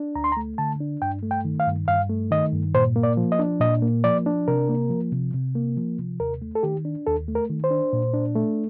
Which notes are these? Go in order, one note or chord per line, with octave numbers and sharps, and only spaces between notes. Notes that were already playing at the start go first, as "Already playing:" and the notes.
Already playing: D4
D2 A#5
C6
A#5
A3
D3 A5
D4
G2 G5
A3
G5
D#3
F5
G2
G2 F5
A3
D#3 D#5
G2
A#2 C5
A#3
D5
F3
D#5
D4
A#2 D#5
A#3
F3 D5
D4
C3 A#4
A#3
F3
C3
C3
A#3
F3
C3
D#2 A#4
A3
A4
D#3 G4
D4
D#2 A4
A3
A#4
D#3
C5
D4
A#2
D4
A3